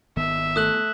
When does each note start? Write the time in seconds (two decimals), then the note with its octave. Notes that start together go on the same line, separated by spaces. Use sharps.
0.17 G#1 D#3 B3 E5
0.56 A3 D#6 F#6 F#7